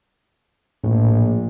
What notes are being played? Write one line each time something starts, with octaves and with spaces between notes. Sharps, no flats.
A#1 A2